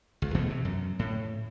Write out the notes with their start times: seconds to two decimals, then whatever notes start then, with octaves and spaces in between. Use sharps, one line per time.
0.22 C#2
0.35 E2 B2 E3 A3
0.50 C3
0.65 F#2
0.99 A2